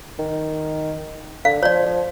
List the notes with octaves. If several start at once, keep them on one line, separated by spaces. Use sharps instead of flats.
D#3
D3 F5
F3 C#5 D5
F3